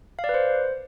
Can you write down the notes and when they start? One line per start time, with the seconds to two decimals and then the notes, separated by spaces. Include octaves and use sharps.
0.19 F5
0.24 D5
0.29 B4
0.34 C5